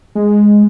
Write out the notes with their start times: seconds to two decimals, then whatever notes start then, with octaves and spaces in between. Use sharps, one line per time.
0.15 G#3